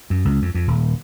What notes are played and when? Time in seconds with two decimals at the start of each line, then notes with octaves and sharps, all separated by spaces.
0.10 F#2
0.25 C#2
0.42 F2
0.55 F2
0.68 D#1